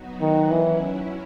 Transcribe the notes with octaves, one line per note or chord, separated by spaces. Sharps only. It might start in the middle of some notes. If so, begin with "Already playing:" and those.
Already playing: F#3 B3 D#4 F#4
D#3
E3 F#3 C#4 E4